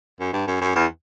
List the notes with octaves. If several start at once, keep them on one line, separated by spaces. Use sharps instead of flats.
F#2
G2
F#2
F#2
E2